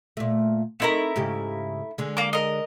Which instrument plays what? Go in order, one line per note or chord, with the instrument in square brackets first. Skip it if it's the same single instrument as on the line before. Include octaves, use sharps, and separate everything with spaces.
[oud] A#2 A3
[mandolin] A3 E4 A#5 [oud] C4 D#4 A#4
[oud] G#2 C#3 G4
D3 G#3
[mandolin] A#3 D6
A#4 D#5